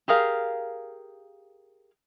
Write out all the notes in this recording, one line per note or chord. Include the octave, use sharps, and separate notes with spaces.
G4 G#4 A#4 F5